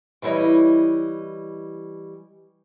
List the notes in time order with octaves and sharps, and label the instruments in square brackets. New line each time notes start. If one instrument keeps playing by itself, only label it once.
[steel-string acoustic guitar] E3 G3 E4 C#5 D#5